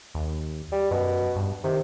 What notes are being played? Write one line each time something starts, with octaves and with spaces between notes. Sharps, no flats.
D#2
G3
F#2 B2
G2
C3 D#3